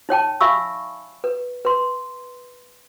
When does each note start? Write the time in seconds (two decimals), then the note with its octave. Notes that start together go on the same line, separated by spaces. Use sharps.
0.09 D#4 C#5 G5 A5
0.41 E5 F5 G#5 B5 C#6 E6
1.24 B4
1.65 B4 C6